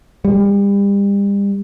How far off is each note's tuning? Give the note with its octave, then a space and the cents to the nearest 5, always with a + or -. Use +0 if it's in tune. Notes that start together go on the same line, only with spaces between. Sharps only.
G3 +35